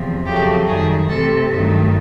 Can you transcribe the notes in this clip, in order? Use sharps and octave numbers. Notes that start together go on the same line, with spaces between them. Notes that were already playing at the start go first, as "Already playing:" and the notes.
Already playing: E2 C3 F3
F2 C#3 F#3 A3 G4
F#2 D#3 G3 G#4
C3 E3 A3 A4
G2 D#3 F#3 A3